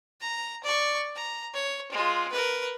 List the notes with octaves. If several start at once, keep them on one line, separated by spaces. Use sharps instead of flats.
A#5
D5 C#6
A#5
C#5
G#3 F4
A#4 B4